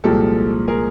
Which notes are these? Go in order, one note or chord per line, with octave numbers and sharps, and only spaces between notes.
C2 A#2 F3 G#3 G4 A4
G#4 A#4